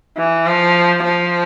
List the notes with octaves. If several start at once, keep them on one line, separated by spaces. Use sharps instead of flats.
E3
F3
F3